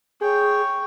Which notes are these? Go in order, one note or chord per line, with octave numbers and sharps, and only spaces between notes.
G#4 C#5 G5